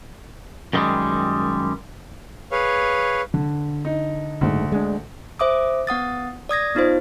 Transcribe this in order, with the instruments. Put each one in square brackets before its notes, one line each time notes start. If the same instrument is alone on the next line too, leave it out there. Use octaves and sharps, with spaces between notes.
[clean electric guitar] F#2 D#3 F3 G3 G#3
[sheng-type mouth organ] G#4 B4 C#5 F5
[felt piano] D3
[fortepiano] D#4
[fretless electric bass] F#1 G#2 [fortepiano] D2
[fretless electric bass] G#3 D4
[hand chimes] C5 E5 D6 D#6
B3 F#5 D#6 A6
D5 D#6 G#6 A#6
B3 D#4 F4 C5